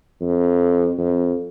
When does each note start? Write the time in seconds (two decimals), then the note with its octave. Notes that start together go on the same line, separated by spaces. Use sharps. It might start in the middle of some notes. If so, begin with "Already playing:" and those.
0.21 F2
0.98 F2